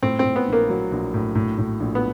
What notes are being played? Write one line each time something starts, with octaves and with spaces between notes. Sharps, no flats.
A2 C4
C4
A2
B3
A#1
A#3
F#3
A#1
A2
A2
A2
A#1
B3